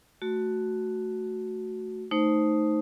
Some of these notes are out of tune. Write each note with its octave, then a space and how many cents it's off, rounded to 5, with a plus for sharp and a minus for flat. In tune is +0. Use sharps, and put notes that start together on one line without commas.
A3 +0 F#4 +0
A3 +0 D#4 +0 C5 +0